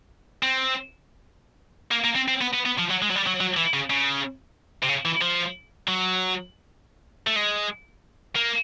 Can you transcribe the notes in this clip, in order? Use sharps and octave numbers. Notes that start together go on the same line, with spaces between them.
C4
A#3
A#3
C4
C4
B3
B3
B3
F3
F#3
G#3
F#3
G3
F#3
F#3
E3
C#3
C#3
C3
C#3
E3
F3
F#3
A3
G#3
A#3